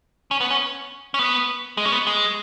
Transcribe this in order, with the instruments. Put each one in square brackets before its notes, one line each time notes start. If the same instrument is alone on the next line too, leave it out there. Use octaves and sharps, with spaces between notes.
[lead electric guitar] C#4
B3
C#4
C#4
B3
G#3
C#4
B3
G#3